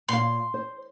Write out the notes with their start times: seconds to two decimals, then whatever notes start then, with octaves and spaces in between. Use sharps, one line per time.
0.09 A#2 F5 C6
0.54 C5